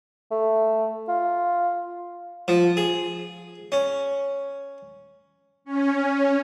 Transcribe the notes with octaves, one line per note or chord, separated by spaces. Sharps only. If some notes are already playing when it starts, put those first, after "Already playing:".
A3
F4
F3
G#4
C#4
C#4